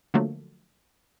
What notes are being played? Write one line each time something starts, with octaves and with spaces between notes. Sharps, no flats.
D3 F3 F#3 A3 A#3